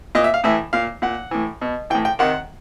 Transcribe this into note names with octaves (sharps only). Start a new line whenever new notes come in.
A#2 D#5
E5
F5
A2 E3 E5
A#2 F5
A#2 F#5
A2 E3
B2
A2 E3 G5
G5
C3 D#3 F#5